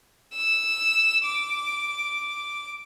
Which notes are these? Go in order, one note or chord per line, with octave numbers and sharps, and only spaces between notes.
E6
D6